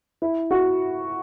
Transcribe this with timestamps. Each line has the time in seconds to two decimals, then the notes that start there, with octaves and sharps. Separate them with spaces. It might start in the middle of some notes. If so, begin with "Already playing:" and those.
0.22 E4
0.51 F#4